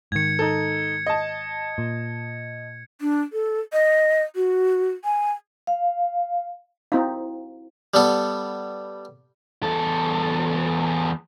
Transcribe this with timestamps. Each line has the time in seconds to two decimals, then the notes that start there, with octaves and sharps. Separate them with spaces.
0.12 G#2 D#3 G#6 C#7
0.39 D#4 A4
1.06 D#5 A5
1.78 A#2
3.01 D4
3.33 A4
3.73 D#5
4.36 F#4
5.04 G#5
5.67 F5
6.92 C4 D#4 E4 F#4 F5
7.94 G3 B3 A4
9.63 E2 A4